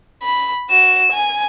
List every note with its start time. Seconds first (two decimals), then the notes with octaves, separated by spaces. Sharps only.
0.23 B5
0.70 F#4 E7
1.12 G#5